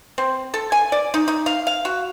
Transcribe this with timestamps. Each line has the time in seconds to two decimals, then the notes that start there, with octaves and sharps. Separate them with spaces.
0.18 C4
0.54 A4
0.72 G#5
0.92 D5
1.14 D#4
1.28 D#4
1.46 F5
1.67 F5
1.85 F#4